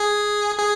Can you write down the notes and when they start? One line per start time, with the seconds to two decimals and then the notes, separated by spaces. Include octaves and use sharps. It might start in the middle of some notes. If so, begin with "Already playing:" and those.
Already playing: G#4
0.58 G#4